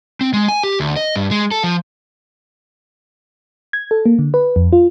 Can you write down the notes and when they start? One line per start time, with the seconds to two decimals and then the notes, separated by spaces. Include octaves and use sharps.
0.21 C4
0.33 G#3
0.48 G#5
0.63 G4
0.80 D2
0.97 D#5
1.16 G2
1.31 G#3
1.51 A4
1.64 F3
3.73 G#6
3.91 A4
4.06 A#3
4.19 D3
4.34 B4
4.56 F2
4.72 F4